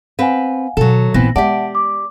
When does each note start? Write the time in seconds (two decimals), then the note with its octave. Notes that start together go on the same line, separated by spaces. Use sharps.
0.19 C4 B4 F5 F#5 G#5
0.77 B2 D#3 F#3 A4
1.14 A1 A#2 E3 B3 C4 A#6
1.36 G#3 G4 D5 E5 F#5 A5
1.75 D6